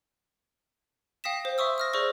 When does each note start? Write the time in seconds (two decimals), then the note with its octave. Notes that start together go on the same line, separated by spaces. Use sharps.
1.24 F5 G5 D#6 A#6 B6 E7
1.45 C5
1.58 E5 C6 C#6 D#6 E6
1.78 D#6 F6 A#6
1.93 G#4 C5 D5 C#6 E6